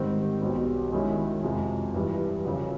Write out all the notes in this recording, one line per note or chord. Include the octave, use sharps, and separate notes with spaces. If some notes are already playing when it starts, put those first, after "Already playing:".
Already playing: G#2 D#3 G3 C4
B1 B2 G3
F#2 D#3 G#3 C#4 E4
F2 C3 F3 G#3
G2 E3 G3
F#2 C#3 F3